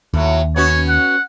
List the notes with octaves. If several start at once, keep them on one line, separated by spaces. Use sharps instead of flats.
D#2 A2 F#3
B3 C#4 F#4 C#5
F#5